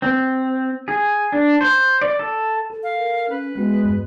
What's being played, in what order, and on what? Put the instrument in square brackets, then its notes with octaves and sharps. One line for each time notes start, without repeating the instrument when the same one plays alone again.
[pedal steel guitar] C4
G#4
D4
C5
D5
A4
[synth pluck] A4
[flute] F5
[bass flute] A#4
[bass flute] C#4 [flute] B4
[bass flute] G#3 [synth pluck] B3 F#4
[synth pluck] E2 G2